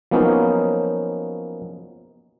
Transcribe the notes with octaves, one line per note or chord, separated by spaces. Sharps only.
F3 F#3 A#3 B3 C#4 D#4